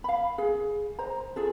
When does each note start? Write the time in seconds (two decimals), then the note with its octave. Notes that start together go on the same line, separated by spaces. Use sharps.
0.04 F5 B5
0.38 G#4
0.99 C5 A#5
1.36 F4 G#4 A4